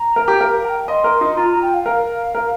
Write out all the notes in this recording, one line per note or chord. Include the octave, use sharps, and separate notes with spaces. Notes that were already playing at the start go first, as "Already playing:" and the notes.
Already playing: A#5
A#4
G4
A#4 F5
A#5
G5
D#5 C6
A#4
D#4
F4 A#5
A#5
G5
F5
A#4
A#4